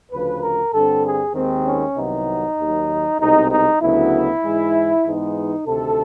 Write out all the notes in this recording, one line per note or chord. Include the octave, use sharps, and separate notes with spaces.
D2 C#3 F3 B4
A#4
G2 D3 G3 C4 A4
G#4
D#2 D#3 G#3 C4
C#4
C2 C3 D#3 F#3 B3 D#4
D#2 D#3 F#3
C2 B2 G#3 C4 D#4
D#4
D2 C#3 F#3 B3 E4
G#2 E3 G#3
G#2 E3 G#3 B3 D#4
D2 C3 D#3 A4